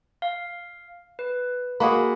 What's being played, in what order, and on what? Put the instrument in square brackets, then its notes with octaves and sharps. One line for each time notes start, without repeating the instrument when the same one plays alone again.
[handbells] F5
B4
[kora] A#3 F#4 G#4 [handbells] B5